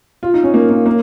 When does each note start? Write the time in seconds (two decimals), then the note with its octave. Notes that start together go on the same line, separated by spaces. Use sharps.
0.23 F4
0.34 D#4
0.44 C#4
0.54 A#3
0.70 A#3
0.86 A#3